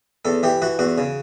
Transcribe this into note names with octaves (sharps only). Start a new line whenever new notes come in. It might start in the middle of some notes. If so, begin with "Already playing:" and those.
E2 A4
E3 G4
E3 F#4
E2 F#4
C#3